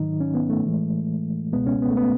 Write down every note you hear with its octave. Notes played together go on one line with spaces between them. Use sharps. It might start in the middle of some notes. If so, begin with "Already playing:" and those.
Already playing: G#2 D#3 F#3 D#4
C#4
B3
A3
A2 E3 G#3
C#2 B2 G#3 B3
C#4
B3
A3
B3